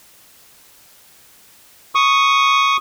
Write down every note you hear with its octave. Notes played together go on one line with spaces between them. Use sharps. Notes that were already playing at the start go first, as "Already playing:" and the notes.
C#6 D#6